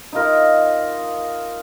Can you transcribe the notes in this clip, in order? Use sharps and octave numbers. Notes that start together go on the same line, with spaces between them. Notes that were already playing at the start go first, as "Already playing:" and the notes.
D#4 F4 A#4